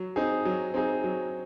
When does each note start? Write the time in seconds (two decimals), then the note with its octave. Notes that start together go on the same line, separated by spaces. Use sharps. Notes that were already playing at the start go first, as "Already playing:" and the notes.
Already playing: F#3
0.16 C4 D#4 G#4
0.45 F#3
0.74 C4 D#4 G#4
1.04 F#3